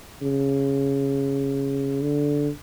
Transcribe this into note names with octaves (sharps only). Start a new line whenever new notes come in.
C#3
D3